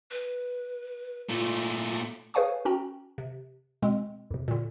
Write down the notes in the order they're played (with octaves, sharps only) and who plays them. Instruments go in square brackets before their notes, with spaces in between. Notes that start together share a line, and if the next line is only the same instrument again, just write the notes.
[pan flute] B4
[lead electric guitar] A#2 A3 [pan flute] F4
[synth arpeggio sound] G#4 B4 C#5 F5 G#5 C#6
C#4 F#4 G5 A#5
C3
B2 G#3 C4
F2 C3
A#2 D3